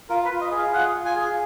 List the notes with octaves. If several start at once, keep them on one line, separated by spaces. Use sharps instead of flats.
F4 A#4
B4
F4
D#5
G#4
F5
F4 F#5
F4
G#5
G#4